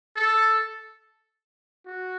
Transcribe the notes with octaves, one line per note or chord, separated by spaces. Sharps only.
A4
F#4